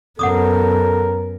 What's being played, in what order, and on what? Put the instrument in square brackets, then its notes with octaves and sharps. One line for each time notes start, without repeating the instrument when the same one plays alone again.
[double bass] F#2 B3 [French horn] A4 [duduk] A#4 [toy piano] F#5 D6 D#6